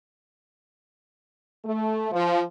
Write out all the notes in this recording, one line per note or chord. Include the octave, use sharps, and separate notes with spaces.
A3
F3